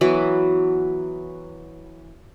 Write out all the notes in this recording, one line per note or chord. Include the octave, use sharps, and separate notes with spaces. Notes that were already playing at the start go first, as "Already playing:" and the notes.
E3 F#3 B3 F#4